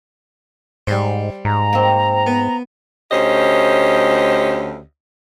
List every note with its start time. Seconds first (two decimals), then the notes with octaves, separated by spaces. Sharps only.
0.87 G#2 G3 C5
1.45 G#2 A#5
1.73 A#3 C4
2.26 B3
3.11 D2 C#4 G4 C5 D#5